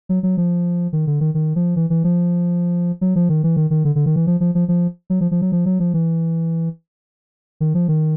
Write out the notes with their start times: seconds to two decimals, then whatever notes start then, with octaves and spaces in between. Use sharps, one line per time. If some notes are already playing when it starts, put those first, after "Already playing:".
0.09 F#3
0.23 F#3
0.37 F3
0.93 D#3
1.07 D3
1.20 D#3
1.34 D#3
1.56 F3
1.76 E3
1.90 E3
2.04 F3
3.01 F#3
3.16 F3
3.29 D#3
3.44 E3
3.57 D#3
3.70 D#3
3.85 D3
3.95 D3
4.06 D#3
4.16 E3
4.27 F3
4.40 F3
4.55 F3
4.68 F3
5.10 F#3
5.21 F3
5.31 F3
5.42 F#3
5.52 F3
5.66 F#3
5.80 F3
5.94 E3
7.60 D#3
7.74 F3
7.88 D#3